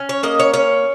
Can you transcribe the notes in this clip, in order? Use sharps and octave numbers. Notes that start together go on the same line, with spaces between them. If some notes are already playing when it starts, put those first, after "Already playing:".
Already playing: C#4
C#5
A#3 D#5
C#5
C#4 C#5